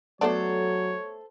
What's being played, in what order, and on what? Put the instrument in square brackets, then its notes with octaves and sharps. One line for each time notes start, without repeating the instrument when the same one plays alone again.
[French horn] F#3 [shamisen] A3 B3 D4 [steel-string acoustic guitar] A4 C5 [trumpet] C#5